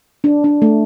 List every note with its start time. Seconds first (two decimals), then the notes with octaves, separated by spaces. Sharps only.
0.24 D4
0.44 D4
0.62 A3